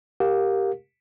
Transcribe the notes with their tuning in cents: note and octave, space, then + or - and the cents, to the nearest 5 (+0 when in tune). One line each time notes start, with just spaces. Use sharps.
G4 +0 A#4 -5 F5 +30